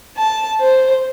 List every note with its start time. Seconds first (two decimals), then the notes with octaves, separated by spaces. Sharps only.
0.16 A5
0.59 C5